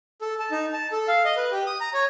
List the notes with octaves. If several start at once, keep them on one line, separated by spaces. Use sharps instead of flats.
A4
A5
D#4
A5
A4
F5
D#5
B4
G4
D#6
A#5
C#5